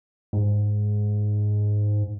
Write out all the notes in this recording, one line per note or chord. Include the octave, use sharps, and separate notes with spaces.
G#2